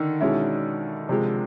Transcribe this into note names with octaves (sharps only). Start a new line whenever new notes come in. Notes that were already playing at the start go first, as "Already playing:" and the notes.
Already playing: D3 D#3
B2 G#3 C#4 E4
C3 F3 G#3